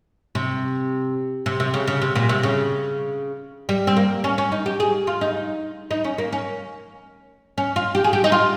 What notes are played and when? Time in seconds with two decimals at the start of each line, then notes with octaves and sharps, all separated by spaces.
0.35 C3
1.46 C3
1.60 C3
1.74 C#3
1.88 C#3
2.02 C3
2.16 A#2
2.29 C3
2.43 C#3
3.69 G3
3.87 C4
3.97 A#3
4.24 C#4
4.38 C#4
4.52 D#4
4.66 G4
4.80 G#4
5.07 F4
5.21 D#4
5.91 D#4
6.04 C#4
6.18 A#3
6.33 C#4
7.58 C#4
7.76 F4
7.95 G4
8.04 G#4
8.13 G4
8.24 D#4
8.32 F4